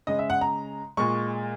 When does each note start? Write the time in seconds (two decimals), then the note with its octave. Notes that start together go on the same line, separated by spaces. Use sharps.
0.07 C#3 G#3 D#5
0.19 E5
0.30 F#5
0.41 A#5
0.97 A#2 G#3 C#6